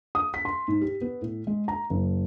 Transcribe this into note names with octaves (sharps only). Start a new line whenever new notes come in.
D#6
B6
C6
G#2
G4
B3
A2
G#3
A#5
F#1